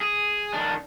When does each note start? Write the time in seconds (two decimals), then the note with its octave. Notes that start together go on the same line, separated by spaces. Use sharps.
0.01 G#4
0.53 D#3 D4